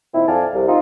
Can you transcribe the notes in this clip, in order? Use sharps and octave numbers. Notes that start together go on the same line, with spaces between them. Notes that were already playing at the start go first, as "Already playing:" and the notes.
A#2 D#3 C4 E4
F2 C4 D5 F5 G#5 A5
C2
C4 D#4 F4